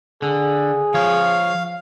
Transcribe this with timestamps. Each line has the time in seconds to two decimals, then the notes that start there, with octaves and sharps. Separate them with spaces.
0.22 D3 G#4
0.94 F3 C#5 F5